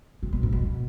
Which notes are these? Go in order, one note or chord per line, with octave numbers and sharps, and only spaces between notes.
C3
B2
G#2
B2